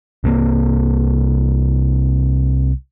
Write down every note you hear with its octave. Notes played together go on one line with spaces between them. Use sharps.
C2 C3 G#3 A#3